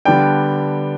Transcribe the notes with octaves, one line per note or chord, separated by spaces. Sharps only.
D3 G3 B3 D4 G5